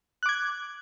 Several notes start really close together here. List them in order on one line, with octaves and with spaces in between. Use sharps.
F#6 D6 G#6